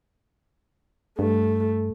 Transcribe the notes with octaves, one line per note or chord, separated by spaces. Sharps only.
G2 A3